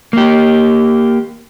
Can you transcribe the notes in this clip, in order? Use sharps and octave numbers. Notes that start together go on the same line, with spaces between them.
A#3 G4